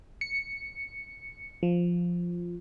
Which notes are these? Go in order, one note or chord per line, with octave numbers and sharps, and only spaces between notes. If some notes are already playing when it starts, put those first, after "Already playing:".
C#7
F3